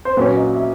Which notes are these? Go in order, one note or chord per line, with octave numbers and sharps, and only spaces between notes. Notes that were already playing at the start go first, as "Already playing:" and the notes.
C5
A#2 F#3 A#3 C#4 B4
D#5
E5